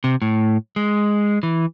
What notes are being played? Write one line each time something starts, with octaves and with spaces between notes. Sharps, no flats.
C3
A2
G#3
E3